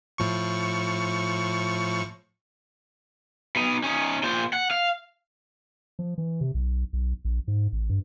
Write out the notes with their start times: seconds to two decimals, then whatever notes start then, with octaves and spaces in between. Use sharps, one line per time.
0.18 A2 F3 C#6
3.56 B2 D#4
3.84 C#4 D#4
4.23 A#2 C5
4.53 F#5
4.71 F5
5.99 F3
6.18 E3
6.41 C3
6.54 B1
6.93 B1
7.25 A#1
7.48 G#2
7.73 A1
7.89 G2